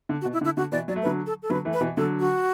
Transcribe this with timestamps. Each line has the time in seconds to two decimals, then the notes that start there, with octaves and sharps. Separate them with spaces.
0.09 D3
0.21 F#4
0.25 B2
0.33 E4
0.41 D3
0.45 E4
0.57 D3 F#4
0.72 B2 E3 D5
0.88 F#3 D5
0.96 A3
1.03 D3 F#3 B4
1.26 A4
1.43 A4
1.50 D3 F#3 B4
1.65 E3 A3
1.73 B4
1.81 B2 E3
1.97 D3 F#3 A4
2.20 F#4